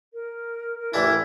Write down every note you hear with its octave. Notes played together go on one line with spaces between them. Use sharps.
A#4
A#4
A1 E3 D4 E4